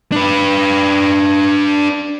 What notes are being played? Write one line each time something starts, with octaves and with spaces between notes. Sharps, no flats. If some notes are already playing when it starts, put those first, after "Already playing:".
D4 B4